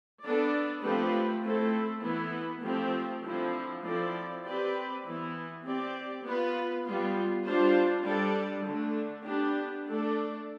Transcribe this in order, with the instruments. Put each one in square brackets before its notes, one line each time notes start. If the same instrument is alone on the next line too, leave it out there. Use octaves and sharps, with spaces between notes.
[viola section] B3 D4 A4 D5
F3 A3 C4 G4 B4
A3 C4 E4 A4
E3 B3 E4
F3 A3 C4 G4
D3 F3 C4 E4
F3 C4 E4 A4 D5
C4 G4 B4 D5
E3 B3 E4
C4 G4 D5
B3 F4 B4
G3 B3 F4
G3 D4 F4 C5
G3 D4 A4 D5
D3 A3 D4
B3 D4 G4
A3 D4 A4 D5